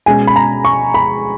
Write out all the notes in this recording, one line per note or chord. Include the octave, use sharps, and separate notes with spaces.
B2 G#3 C#4 G#5
B5
A#5
C#6
B5